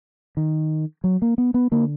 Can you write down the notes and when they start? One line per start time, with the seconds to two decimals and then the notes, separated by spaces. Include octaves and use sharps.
0.37 D#3
1.04 F#3
1.22 A#3
1.38 B3
1.54 B3
1.71 D3 A#3